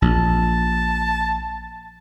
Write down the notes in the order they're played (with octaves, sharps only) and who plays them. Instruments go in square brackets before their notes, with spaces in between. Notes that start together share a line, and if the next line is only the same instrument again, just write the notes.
[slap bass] A#1 [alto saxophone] A5